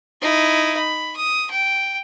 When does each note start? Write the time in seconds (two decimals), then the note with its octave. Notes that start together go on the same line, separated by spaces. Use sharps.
0.21 D#4 E4
0.77 B5
1.16 D#6
1.51 G5